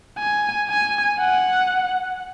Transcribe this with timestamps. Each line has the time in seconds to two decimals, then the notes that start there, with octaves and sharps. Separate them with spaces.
0.18 G#5
0.69 G#5
1.19 F#5